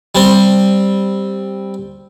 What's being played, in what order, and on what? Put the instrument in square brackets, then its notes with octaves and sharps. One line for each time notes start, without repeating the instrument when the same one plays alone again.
[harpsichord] G3 C4